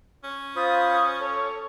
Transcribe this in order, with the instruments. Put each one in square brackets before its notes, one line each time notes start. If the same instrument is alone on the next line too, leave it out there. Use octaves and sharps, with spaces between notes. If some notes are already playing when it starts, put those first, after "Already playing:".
[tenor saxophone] C#4
[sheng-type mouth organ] F4 C5 B5 [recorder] D#6
[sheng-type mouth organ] A4 [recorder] C#5